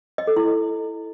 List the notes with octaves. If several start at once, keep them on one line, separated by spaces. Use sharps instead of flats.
D#5
A4
E4